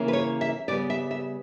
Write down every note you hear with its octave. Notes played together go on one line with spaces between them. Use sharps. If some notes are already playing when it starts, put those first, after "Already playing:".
Already playing: C#3 E3 A#3 C#4
B4
C#5
E5
C#3 G3 B3 D5
E5
E5